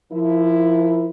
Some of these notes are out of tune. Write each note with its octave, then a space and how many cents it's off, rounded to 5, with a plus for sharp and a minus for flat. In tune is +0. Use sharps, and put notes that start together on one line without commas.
F3 -20 E4 +0 A#4 +0